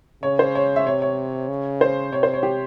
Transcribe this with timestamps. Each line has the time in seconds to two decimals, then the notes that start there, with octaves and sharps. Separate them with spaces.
0.23 C#3 C#5
0.39 C5
0.55 C#5
0.76 E5
0.86 C3 C#5
1.02 C#5
1.49 C#3
1.81 C5
2.12 C3 C#5
2.23 C5
2.34 C#5
2.43 G4